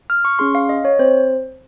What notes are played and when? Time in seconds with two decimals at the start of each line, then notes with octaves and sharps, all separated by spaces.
0.10 F6
0.25 C#6
0.39 C#4 G#4 C6
0.55 F5
0.69 D#5
0.85 C#5
0.99 C4 C5